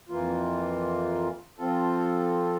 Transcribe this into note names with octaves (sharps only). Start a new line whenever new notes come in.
F2 E3 A#3 F4
F3 C4 F4 A4